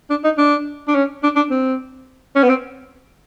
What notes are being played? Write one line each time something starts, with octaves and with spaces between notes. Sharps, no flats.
D4
D#4
D4
D4
C#4
D4
D4
C4
C#4
B3
C4